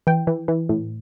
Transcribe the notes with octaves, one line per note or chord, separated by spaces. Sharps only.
E3 G5
E3
E3
A2